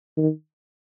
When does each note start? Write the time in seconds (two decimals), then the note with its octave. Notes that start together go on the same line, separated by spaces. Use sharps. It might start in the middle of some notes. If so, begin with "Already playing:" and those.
0.17 D#3